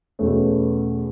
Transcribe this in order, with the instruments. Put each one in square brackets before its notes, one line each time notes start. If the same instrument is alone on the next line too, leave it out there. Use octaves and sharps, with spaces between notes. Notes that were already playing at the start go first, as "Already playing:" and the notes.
[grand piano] E2 B2 A3 C#4